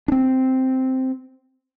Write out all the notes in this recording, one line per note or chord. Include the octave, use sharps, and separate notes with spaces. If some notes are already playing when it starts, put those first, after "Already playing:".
C4 D4